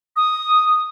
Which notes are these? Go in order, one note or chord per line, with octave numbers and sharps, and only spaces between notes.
D#6